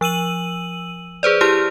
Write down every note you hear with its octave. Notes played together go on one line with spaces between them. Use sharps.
F3 E6 D#7 F#7
G#4 B4 C5 D5
E4 G4 F6